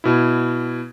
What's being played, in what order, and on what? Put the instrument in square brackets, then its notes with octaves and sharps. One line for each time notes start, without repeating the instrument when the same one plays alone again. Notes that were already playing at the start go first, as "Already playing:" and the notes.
[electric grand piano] B2 E4